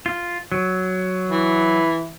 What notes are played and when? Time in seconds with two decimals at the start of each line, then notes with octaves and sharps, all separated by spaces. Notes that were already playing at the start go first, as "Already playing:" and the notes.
0.06 F4
0.52 F#3
1.29 E3